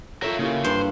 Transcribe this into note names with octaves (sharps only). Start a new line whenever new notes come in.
F4 A4 A#4 C#5 E5
C#3 A#3 E4 G4
G2 C5